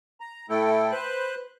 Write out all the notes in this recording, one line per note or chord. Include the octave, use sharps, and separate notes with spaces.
A#5
A2 A3 E4 A4 G5
B4 C5 F#6